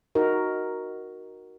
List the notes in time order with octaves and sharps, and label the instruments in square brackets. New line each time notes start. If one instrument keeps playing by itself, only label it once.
[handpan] D#4 F#4 A#4